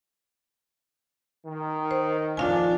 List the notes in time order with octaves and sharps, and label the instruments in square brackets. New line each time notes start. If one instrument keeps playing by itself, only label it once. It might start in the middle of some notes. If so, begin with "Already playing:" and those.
[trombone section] D#3
[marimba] C5
[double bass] F2 D4 [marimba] F4 F5 G#5